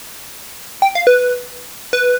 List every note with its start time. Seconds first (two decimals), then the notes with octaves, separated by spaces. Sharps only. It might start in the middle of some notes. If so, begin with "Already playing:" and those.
0.82 G5
0.95 F5
1.07 B4
1.93 B4